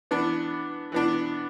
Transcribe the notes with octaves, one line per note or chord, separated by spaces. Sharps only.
E3 B3 D4
E3 B3 D4